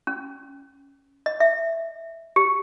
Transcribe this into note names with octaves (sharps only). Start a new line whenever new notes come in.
C#4
D#5
E5
G4